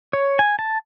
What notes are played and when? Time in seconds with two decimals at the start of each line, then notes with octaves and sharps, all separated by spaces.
0.13 C#5
0.39 G#5
0.59 A5